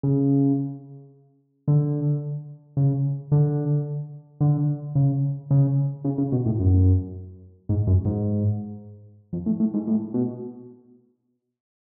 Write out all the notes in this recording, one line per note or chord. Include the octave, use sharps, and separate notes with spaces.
C#3
D3
C#3
D3
D3
C#3
C#3
C#3
C#3
B2
A2
F#2
G#2
F#2
G#2
F2
A2
A2
G#2
A2
B2